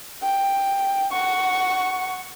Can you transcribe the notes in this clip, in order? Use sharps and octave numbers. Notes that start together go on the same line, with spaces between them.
G5
F#5 C#6